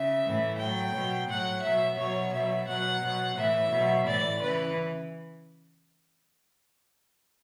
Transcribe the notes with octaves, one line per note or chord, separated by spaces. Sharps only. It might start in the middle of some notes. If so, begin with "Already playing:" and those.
Already playing: C#3 E5
A2 E3
A2 F#3 G5
B2 F#3
A2 F#3 F#5
B2 F#3 E5
B2 F#3 C#5
B2 F#3 E5
B2 F#3 F#5
B2 F#3
A2 E3 E5
B2 F#3
A2 E3 D5
C#3 E3 B4